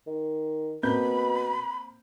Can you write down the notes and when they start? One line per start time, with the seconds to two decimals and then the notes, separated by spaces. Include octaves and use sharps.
0.07 D#3
0.83 B2 A#3 C4 B5 G6